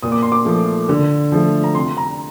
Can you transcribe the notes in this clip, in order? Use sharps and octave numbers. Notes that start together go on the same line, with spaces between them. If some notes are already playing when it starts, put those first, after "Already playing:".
A#2 D#6
D6
C6
D6
F3 A3
D3
F3 A3
A#5
C3 C6
A#5